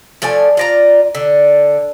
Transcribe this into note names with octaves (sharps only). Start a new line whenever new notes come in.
F3 A3 D5 G#5
F4 D5 A#5
D3